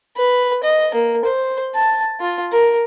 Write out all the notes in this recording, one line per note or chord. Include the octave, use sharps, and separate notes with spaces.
B4
D#5
A#3
C5
A5
F4
A#4